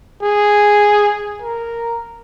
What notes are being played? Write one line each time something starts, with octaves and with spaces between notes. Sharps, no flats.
G#4
A#4